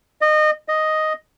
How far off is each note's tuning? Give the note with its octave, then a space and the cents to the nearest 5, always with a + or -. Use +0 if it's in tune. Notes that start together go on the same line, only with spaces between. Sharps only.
D#5 -25
D#5 +0